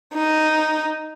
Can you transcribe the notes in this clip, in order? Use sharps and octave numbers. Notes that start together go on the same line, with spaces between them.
D#4